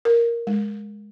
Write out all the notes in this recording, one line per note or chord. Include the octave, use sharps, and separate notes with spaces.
A#4
G#3